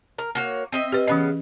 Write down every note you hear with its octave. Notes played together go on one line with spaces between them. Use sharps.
A#4
A#3 F#4 C#5
C4 D#5 E5
G4 B4
C#3 E3 B3 C#4 D#5